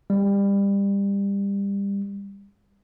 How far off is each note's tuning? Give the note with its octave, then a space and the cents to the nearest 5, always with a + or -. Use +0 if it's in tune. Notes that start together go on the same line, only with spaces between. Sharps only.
G3 +25